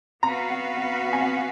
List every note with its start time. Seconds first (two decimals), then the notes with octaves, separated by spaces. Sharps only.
0.23 B3 F#4 B4 F5 A#5
0.50 F#5
0.77 F#5
1.05 F#5
1.13 G#5
1.21 F#5